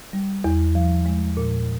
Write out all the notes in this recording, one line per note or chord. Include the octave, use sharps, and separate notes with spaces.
G3
E2
F3
G#3
A#2